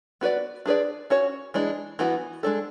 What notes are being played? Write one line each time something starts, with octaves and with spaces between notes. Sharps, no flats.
B3 F#4 B4 D5
D4 G#4 B4 D5
C#4 F#4 C#5
E3 G#3 D4
E3 B3 F#4
G#3 D4 A4